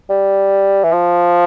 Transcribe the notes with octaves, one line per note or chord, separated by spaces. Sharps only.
G3
E3
F3